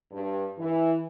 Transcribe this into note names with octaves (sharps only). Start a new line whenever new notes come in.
G2
E3